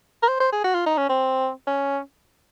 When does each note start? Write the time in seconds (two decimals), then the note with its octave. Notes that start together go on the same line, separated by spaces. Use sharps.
0.23 A#4
0.28 C5
0.40 C5
0.52 G#4
0.64 F#4
0.75 F4
0.86 D#4
0.98 C#4
1.09 C4
1.67 C#4